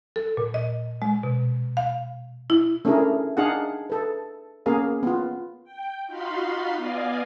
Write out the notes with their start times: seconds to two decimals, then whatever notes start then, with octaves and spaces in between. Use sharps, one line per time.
0.16 A4
0.37 A#2
0.54 D#5
1.02 G#3
1.23 B2
1.77 F5
2.50 E4
2.85 A3 C#4 D4 E4 G#4 A#4
3.37 D4 D#4 G#4 F5 F#5
3.90 A4 B4
4.66 A#3 B3 C#4 G#4 A#4 F5
5.03 B3 F4
5.64 G5
6.06 D#4 F4 F#4 F5 B5 C6
6.76 B3 D5 D#5 F5 G#5